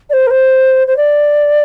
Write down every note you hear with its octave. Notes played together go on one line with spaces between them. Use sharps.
D5
C5
A#4
C5
C5
D5